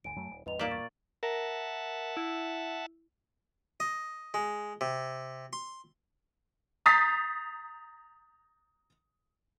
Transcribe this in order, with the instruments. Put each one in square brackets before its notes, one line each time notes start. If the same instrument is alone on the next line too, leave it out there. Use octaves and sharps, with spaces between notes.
[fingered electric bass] G1 D2 [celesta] G#5 D7
[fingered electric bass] F#2 F#3 A3
D#1
[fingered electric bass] A1 E2 G2 [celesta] B4 D#5 F7
[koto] A#2 A#3 D5 [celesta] B6 E7
[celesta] C#6 A6
[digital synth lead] A#4 [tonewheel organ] E5 F#5 A5
[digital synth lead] E4
[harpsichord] D#5
G#3
C3
C6
[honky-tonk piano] A#5 D#6 G6 A6 B6 C7